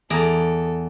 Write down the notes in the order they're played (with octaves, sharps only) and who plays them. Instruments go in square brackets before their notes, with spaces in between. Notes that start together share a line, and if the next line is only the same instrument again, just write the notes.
[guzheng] E2 D5 A#5 [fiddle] A4